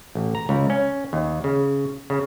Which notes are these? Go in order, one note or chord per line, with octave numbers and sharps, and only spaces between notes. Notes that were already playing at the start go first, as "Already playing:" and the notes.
A1
A#5
C#2
C#4
D#2
C#3
C#3